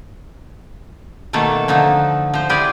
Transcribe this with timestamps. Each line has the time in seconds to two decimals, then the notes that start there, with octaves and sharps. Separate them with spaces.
1.33 B2 D#3 A3 A#3 A4 F5
1.68 D3 F3 D#4 A4
2.34 F3 C5
2.49 E4 F4 G4 G#4 C5 D5